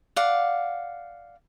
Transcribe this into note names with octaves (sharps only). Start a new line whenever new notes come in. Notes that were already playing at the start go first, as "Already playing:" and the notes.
D5 F5 F#5